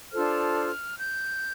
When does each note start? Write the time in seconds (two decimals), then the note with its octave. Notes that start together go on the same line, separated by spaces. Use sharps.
0.11 D4 F4 A4 C5 F6
0.96 G6